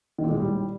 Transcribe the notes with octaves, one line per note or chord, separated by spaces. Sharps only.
D#3
A#2
G#3
A2
G3